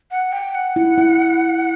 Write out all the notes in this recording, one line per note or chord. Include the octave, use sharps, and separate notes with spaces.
F#5
G5
F#5
E4
E4